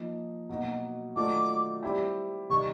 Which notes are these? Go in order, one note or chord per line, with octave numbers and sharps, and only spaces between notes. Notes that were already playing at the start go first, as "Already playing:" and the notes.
Already playing: F3 A#3 D#4
B2 F#3 A#3 D#4 F#4
D#3 F#3 A3 D4 F4 D6
G3 C4 E4 G4
C3 D#3 G3 C#6